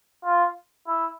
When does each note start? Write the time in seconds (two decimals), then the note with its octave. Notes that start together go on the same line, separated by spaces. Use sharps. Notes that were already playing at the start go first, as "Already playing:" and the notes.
0.25 F4
0.87 E4